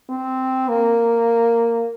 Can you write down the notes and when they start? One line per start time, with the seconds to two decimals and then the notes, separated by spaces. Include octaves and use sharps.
0.09 C4
0.68 A#3